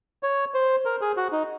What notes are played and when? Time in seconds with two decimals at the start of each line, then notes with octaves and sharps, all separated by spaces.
0.23 C#5
0.54 C5
0.85 A#4
1.01 G#4
1.17 F#4
1.32 D#4